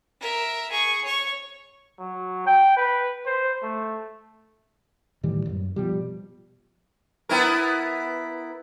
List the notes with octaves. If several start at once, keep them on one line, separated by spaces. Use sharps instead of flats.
A#4 E5
G#4 C#6
C#5 C#6
F#3
G5
B4
C5
A3
A2 D#3 E3 G3
E1 F#2
B2 F3 G3
B3 E4 A#4